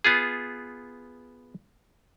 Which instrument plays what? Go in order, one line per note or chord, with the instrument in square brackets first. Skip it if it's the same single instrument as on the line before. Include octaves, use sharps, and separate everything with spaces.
[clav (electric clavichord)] B3 F4 G#4